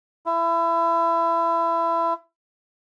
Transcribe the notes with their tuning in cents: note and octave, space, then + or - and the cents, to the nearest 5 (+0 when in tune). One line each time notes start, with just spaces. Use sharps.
E4 +25